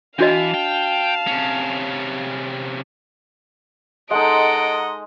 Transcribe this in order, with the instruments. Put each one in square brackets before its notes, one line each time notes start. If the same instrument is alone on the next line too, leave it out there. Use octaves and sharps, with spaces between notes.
[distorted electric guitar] E3 [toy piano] D4 F#4 D#5 [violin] F5 A5
[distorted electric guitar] G5
C3 C#4
[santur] G#3 D#4 [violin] A4 D7 [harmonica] D#5 [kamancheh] F#5 A#5